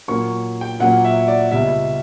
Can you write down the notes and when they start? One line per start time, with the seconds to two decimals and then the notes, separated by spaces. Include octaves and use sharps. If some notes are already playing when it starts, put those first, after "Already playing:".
0.08 A#2 F#3 A#3 C#4 C#6
0.61 G5
0.80 A#2 F#3 A#3 C#4 F#5
1.04 E5
1.28 D5
1.51 C#2 B2 G3 E5